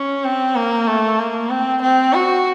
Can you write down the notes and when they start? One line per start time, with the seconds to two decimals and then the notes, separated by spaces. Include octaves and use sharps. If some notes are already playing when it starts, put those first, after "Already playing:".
Already playing: C#4
0.25 C4
0.56 A#3
0.87 A3
1.19 A#3
1.50 C4
1.82 C4
2.14 F#4